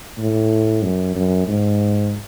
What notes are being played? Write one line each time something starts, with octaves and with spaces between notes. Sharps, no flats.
A2
F#2
F#2
G#2